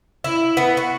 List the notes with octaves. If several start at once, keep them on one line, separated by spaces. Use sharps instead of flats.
E4
B3
F#4